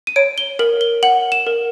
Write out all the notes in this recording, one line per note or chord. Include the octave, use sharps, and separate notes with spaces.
D#7
C#5 D7
G7
A#4 F#7
G7
F#5 F#7
E7
A#4